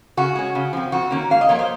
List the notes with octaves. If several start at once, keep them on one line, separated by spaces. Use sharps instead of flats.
C#3 F#4
G#3 C#4
C#3
F3 C4
F2 F#4
D#3 A#3 C#4
G#2 F5
D#5
F3 A#3 C#5
C5